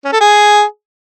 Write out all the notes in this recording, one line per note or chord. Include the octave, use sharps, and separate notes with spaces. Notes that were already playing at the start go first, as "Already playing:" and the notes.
C#4
A4
G#4